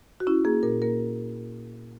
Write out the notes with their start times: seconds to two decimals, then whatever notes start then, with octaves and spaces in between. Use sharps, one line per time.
0.20 F#4
0.27 C#4 E4
0.45 A#3 G#4
0.63 A#2 A#4
0.82 A#3 A#4